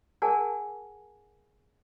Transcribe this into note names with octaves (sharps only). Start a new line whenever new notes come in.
G#4 A#4 D5 F#5 G#5 A5